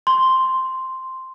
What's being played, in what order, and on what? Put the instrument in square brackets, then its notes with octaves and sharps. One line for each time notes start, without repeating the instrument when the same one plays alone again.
[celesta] C6